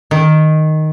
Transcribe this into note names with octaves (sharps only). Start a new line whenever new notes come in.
D#3